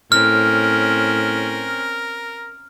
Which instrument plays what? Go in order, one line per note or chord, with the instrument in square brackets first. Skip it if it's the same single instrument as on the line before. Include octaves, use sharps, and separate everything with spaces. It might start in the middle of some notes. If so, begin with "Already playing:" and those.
[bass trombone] A2 [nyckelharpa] C4 C#4 [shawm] A#4 [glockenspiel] F6